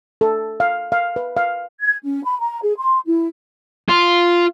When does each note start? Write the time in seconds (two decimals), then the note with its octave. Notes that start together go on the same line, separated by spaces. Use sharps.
0.21 A4
0.60 F5
0.92 F5
1.16 B4
1.37 F5
1.81 G#6
2.04 C#4
2.24 B5
2.40 A#5
2.63 G#4
2.78 C6
3.06 E4
3.89 F4